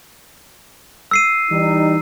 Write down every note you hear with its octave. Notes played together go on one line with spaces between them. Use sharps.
E6 C7 D#7
E3 G3 D#4